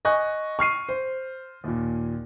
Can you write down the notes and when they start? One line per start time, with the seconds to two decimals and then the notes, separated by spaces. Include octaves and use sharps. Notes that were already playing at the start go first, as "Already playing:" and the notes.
0.05 D#5 G#5 C#6 F#6
0.59 C#6 F6 C7 D#7
0.89 C5
1.64 D#2 A#2